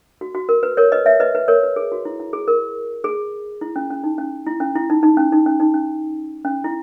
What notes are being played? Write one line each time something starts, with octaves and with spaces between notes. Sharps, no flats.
F#4
F#4
A#4
B4
A#4 C#5
B4 D#5
C#5 E5
B4 D#5
B4
A#4 C#5
B4
G#4
F#4
E4
E4
G#4
A#4
G#4
E4
C#4
C#4
D#4
C#4
E4
C#4
E4
D#4
D#4
C#4
D#4
C#4
D#4
C#4
C#4
E4